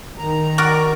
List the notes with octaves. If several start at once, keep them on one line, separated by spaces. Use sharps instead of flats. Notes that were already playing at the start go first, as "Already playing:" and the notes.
D#3 A#5
F#4 A#4 D5